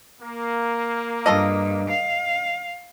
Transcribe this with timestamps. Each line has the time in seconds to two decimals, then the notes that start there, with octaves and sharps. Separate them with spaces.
0.21 A#3
1.26 G2 F4 A4 D#5
1.90 F5